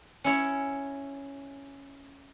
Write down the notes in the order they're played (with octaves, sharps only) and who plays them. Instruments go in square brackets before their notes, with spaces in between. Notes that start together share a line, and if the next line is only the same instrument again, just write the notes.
[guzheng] C#4 E4 C#5